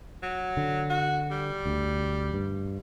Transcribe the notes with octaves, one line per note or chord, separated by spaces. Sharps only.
F#3
D3
F#4
G3
D2
G2